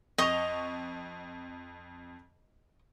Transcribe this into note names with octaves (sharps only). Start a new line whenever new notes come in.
F2 D#5 C#6 D#6 F7